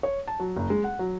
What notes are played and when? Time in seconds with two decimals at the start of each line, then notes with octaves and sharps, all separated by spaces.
0.03 C#5
0.28 A5
0.40 F#3
0.57 F#1
0.70 G#3
0.84 F#5
0.99 F#3